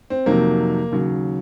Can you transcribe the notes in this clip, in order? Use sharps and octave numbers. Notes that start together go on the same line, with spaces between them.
C4
F2 C3 D#3 F#3 A#3
D#2 C#3 F#3